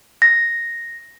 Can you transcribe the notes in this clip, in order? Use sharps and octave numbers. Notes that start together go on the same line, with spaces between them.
A#6